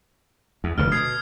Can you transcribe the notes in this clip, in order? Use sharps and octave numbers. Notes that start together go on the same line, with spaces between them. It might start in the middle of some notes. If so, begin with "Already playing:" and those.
E2
F1 D2 G2 F6
B2 D#6 G#6 C7